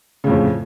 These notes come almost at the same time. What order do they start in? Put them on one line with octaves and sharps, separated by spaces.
C#3 A2 F2